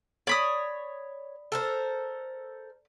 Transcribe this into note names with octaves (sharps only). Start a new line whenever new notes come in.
C#5 D5 B5 D#6
A4 A#4 C5